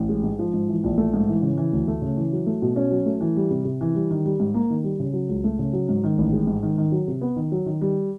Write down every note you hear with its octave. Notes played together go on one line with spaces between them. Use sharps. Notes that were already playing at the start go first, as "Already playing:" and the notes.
Already playing: A1
G#3
G#2
F3
G#2
E3
A#1
A3
G#2
E3
C#3
E3
D2
A3
C#3
E3
F#3
A3
B2
C#4
F#3
A3
E3
G3
C3
C3
E3
G3
D#3
G3
G#2
A#3
D#3
G3
C#3
F#3
C#2
A3
C#3
F#3
G#2
D#3
A1
G#3
G#2
D#3
D#3
F#3
C3
B3
D#3
F#3
D#3
G3